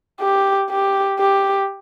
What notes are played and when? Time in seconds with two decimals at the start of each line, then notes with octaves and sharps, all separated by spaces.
0.21 G4
0.70 G4
1.20 G4